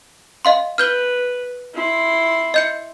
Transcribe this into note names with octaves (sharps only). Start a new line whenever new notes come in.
D#5 F5 C6
B4 F6 G6 G7
E4 C6
D#5 G6 C#7